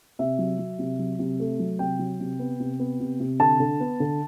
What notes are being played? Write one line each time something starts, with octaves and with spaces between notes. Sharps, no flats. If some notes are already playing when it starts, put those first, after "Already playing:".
C3 E5
F#3
F#3
C3
F#3
C3
A3
F#3
C3 G5
F#3
C3
B3
C3
B3
C3
C3
D3 A5
D3
B3
D3